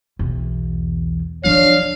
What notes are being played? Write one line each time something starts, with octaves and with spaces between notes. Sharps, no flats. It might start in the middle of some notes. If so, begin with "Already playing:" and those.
B1 E2
F3 F#3 D4 C#5 F5